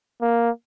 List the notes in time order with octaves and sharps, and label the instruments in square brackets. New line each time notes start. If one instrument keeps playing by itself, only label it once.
[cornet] A#3